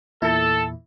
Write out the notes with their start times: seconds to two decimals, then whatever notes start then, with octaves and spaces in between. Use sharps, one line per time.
0.22 E2 A#2 E4 A4